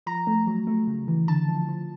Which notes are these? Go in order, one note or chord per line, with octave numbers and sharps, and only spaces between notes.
F3 A#5
A3
F#3
A3
C#3
E3
D3 A5
F3
F3